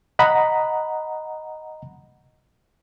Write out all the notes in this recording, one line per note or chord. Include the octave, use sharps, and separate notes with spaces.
D#5 F#5 A#5 B5